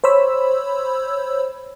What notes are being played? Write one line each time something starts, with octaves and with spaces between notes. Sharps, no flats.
C5 C#5 B5 E6